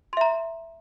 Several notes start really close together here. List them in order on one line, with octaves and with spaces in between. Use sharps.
C6 E5 A#5